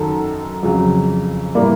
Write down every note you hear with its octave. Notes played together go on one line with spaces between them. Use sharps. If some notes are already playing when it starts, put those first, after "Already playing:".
Already playing: F#2 D#3 F#3 A4
F2 C#3 F#3
A2 E3 G3 A#3 D5